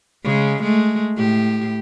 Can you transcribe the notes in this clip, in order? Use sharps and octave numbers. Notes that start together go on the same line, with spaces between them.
C#3 G#3
G#3 A3
A2 G4